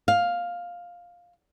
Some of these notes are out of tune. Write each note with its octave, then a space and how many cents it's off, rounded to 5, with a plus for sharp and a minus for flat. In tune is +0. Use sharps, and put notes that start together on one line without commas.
F5 +5